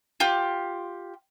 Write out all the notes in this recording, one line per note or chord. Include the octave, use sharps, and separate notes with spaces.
F4 G4